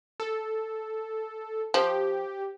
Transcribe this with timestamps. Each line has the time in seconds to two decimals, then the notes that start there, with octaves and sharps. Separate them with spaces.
0.20 A4
1.74 F3 G4